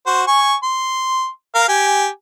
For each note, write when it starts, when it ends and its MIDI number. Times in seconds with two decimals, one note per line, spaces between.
0.07 0.22 66
0.07 0.22 72
0.27 0.54 80
0.27 0.54 85
0.63 1.28 84
1.55 1.68 70
1.55 1.68 77
1.68 2.07 67
1.68 2.07 80